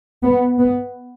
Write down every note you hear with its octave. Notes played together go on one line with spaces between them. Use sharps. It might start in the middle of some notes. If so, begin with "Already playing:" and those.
B3
B3